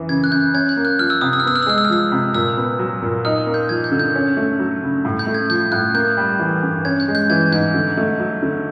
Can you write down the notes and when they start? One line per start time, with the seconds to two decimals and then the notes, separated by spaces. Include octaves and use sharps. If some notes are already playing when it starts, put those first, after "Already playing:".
Already playing: F#2 E3
0.09 C#3 G#6
0.24 F#6
0.31 F#2 G6
0.54 C#4 G#6
0.69 G6
0.77 A#3
0.85 F#6
0.99 F3 F6
1.10 E6
1.21 C3 D#6
1.33 E6
1.40 F6
1.44 B3 E6
1.56 F6
1.63 E6
1.66 G#3 F6
1.78 E6
1.85 F6
1.89 F3 E6
2.12 C3
2.35 A#2 E6
2.57 B3
2.79 F#3
3.02 A#2
3.25 D#4 F6
3.46 A#3
3.54 G6
3.69 F3 G#6
3.84 G6
3.92 D3
4.00 G6
4.15 C#4
4.37 A3
4.59 F#3
4.82 C#3
5.05 A2
5.19 G6
5.27 A3
5.34 G#6
5.50 F3 G6
5.72 A2 F#6
5.94 A#3 G6
6.17 G3
6.39 E3
6.63 G2
6.85 C#4 G#6
7.00 G6
7.08 G#3
7.15 G6
7.30 E3 G#6
7.52 G#2 G6
7.74 D3
7.97 A3
8.19 F#3
8.42 D3